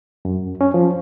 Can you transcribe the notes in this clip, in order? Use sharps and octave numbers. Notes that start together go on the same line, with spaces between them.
F#2
C#4
F3